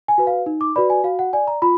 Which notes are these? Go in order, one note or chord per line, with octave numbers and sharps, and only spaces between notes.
G#5
F#4 B4
F5
D#4
D6
F#4 B4 D5 B5
G#5
F#4 F5
F#5
D5 G#5
A#5
F4 B5